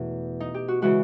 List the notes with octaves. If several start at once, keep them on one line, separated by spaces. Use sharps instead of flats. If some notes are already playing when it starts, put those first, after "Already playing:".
Already playing: E2 B2 A3
D#4
G4
F#4
C#3 E3 G#3 F#4